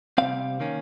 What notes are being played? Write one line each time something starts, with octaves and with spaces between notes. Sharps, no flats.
C3 G3 C4 F5
D#3 A#3 C#4